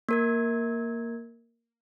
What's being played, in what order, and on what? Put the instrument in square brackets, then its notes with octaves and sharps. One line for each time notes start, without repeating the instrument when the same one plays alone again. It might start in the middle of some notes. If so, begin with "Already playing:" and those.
[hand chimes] A#3 A#4 G#6